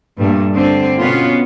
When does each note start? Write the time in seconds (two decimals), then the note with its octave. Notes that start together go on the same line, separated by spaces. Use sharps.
0.17 G2 A#2 A3
0.53 D3 C4
1.01 B2 B3 C#4 F4